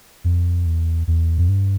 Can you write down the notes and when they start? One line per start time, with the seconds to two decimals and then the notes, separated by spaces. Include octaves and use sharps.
0.24 F2
0.66 E2
1.07 E2
1.38 F2
1.49 G2